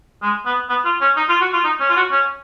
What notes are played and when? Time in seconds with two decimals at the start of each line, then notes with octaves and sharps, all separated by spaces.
0.22 G#3
0.46 B3
0.69 B3
0.85 F4
1.01 C#4
1.16 D#4
1.29 F4
1.41 F#4
1.53 F4
1.64 D#4
1.80 C#4
1.89 F4
1.96 F#4
2.11 C#4